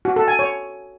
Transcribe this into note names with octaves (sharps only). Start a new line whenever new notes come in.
F#4
A4
G#5
C#5